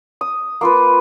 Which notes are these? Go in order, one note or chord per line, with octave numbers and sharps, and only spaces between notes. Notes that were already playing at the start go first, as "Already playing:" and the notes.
D#6
A#3 F4 B4